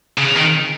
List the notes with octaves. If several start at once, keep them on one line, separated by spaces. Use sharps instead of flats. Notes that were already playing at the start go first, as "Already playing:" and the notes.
C#3
D#3